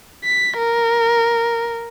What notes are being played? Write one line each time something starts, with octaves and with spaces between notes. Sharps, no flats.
B6
A#4